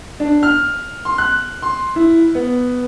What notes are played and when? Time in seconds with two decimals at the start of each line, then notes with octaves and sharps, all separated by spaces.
0.20 D4
0.43 F6
1.05 C6
1.18 F#6
1.62 C6
1.96 E4
2.35 B3